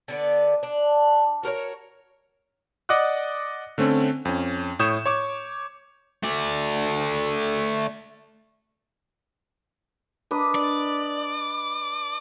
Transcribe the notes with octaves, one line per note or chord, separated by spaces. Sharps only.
D3 B3 D5
D4
F#4 A#4 B4 C#5
D5 D#5 F#5 D6 D#6 F#6
D3 A3 C4 C#4
F2 C#4
A2 C#5 D#6 G6 E7
C#5 C#6 D6
A3 D5
D4 B4 D#5
D5